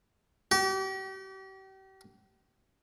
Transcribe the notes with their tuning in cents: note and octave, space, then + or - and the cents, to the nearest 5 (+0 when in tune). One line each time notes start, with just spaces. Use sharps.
G4 -40